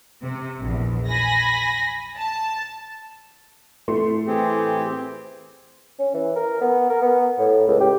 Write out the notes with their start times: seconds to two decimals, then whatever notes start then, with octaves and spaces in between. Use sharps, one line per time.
0.23 C3
0.59 A#1 E2
1.09 G#5 B5 A#6
2.17 A5
3.88 A2 A3 C6
4.27 E3 C4 G4 G#4
5.99 C#4
6.14 E3
6.36 A#4
6.61 B3
6.90 A#4
7.02 B3
7.39 A2
7.68 C#2
7.80 G4